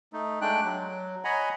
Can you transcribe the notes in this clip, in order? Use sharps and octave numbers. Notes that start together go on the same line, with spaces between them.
A3 D#4
G#3 A3 D4 G5 F#6
F#3
C#5 D#5 F#5 G#5 A#5 B5